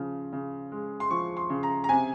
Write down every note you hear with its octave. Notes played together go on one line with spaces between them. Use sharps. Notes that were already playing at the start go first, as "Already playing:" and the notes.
Already playing: C#3 F3
C#3
G#3
C6
F3 C#6
C6
C#3
A#5
A#5
C3 G#5